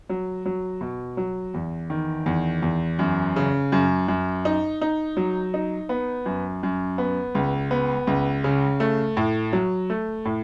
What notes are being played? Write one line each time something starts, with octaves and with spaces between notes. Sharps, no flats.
F#3
F#3
B2
F#3
E2
D#3
E2
E2
F#2
C#3
F#2
F#2
D#4
D#4
F#3
D#4
B3
F#2
F#2
B3
C#2
B3
C#2
C#3
A3
A2
F#3
A3
A2